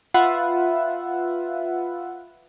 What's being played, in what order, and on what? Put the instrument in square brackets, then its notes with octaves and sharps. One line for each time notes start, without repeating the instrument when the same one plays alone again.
[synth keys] F4 B4 E5 F#5